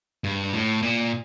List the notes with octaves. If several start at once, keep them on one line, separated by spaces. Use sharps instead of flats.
G2
A2
A#2